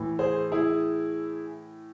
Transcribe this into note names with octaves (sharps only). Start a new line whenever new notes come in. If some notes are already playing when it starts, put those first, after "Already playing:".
Already playing: A2 E3
G#4 C5
E4 G#4